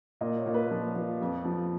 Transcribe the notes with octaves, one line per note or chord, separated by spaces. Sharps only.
A#2 D#5
C#5
A#2
B4
F3
F3
F2
F3